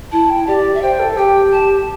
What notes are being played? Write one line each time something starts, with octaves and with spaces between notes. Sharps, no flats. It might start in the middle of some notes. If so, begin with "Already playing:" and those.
E4 A5
G5
G4 D5
E5
C5 G5
A4
G4 G5
A5